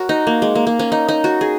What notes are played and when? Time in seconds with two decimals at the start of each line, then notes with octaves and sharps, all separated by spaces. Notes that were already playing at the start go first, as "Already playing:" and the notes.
Already playing: F#4 A#4 C#5
0.09 D#4
0.27 A#3
0.42 G#3
0.55 A#3
0.67 A#3
0.79 C#4
0.92 D#4
1.09 D#4
1.24 F#4
1.41 G#4